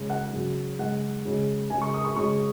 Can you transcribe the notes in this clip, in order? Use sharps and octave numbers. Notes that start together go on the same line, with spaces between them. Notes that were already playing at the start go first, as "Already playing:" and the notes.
Already playing: C#3 G#3
F#5
C#3 F#3
C#3 G#3 F#5
C#3 G#3
C#3 G#3 G#5
C#6
D#6
C#6
C#3 G#3 C#6